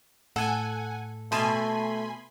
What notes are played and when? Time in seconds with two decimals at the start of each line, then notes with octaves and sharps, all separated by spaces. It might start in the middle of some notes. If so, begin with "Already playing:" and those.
0.36 A2 A4 F#5 G#5
1.32 B2 A3 G#5 A5 B5 C6